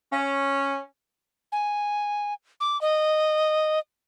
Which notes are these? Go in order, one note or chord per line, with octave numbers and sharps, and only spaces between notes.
C#4
G#5
D6
D#5